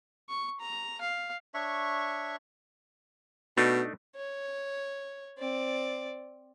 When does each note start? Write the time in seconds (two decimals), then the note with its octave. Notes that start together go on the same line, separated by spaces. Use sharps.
0.29 C#6
0.60 A#5
1.01 F5
1.54 D4 C#5 E5 C#6
3.57 B2 A3 D4 D#4
4.16 C#5
5.38 C4 D5